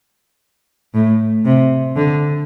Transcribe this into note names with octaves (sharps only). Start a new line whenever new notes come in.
A2
C3
D3